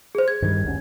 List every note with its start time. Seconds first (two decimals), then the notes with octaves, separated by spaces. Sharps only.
0.15 G#4 C5
0.28 G#6
0.42 G2 D#3 G3
0.64 G1 D2 C#4